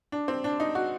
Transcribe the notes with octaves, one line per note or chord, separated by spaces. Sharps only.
D4
C4
D4
D#4
F#4